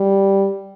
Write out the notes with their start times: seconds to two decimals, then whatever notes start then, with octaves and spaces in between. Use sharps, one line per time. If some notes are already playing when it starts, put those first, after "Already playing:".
Already playing: G3